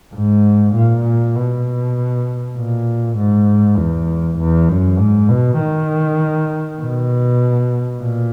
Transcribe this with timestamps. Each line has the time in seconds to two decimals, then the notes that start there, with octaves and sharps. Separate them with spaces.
0.14 G#2
0.75 A#2
1.36 B2
2.56 A#2
3.17 G#2
3.77 E2
4.38 E2
4.69 F#2
4.99 G#2
5.29 B2
5.59 D#3
6.81 B2
8.02 A#2